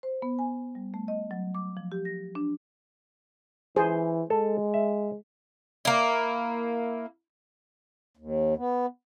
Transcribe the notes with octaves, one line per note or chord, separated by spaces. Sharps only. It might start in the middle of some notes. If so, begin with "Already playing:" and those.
C5
B3
G#5
G3
A3
D#5
F#3
D6
F3
G4
A#6
D4
E3 G#4 C5
G#3 A4
E5
A#3 E4
D#2
B3